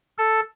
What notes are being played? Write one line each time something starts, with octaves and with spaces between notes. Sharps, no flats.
A4